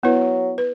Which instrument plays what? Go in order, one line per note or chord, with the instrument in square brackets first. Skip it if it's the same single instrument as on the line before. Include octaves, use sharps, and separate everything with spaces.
[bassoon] F#3 [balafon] B3 E4 B4
[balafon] B4